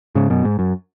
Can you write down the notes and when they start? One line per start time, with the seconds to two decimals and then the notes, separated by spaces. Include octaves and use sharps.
0.15 G#2 C#3
0.30 F#2 B2
0.45 G#2
0.59 F#2